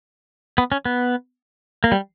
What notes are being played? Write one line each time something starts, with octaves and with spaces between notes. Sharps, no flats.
B3
C#4
B3
A#3
G3